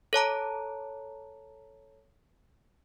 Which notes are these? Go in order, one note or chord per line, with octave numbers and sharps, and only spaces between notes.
A4 C#5 A5 A#5